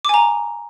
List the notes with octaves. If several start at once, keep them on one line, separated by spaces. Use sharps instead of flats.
G#5 A#5 D6